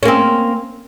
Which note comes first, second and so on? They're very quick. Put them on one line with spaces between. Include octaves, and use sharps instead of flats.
C#4 A#3 C4